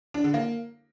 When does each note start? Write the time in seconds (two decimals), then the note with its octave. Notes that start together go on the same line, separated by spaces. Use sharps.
0.14 D4
0.24 D3
0.34 A#3